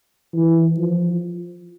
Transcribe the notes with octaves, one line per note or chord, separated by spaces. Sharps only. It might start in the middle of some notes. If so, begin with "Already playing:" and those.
E3
F3